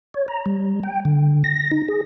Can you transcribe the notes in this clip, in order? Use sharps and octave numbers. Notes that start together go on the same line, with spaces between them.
C#5
A#5
G3
G5
D3
A#6
D#4
G#4